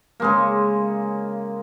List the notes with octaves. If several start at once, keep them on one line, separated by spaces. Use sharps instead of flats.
C#3 G#3 A#3